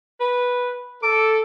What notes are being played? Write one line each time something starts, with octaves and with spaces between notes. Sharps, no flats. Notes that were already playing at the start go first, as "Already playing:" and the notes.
B4
A4 D6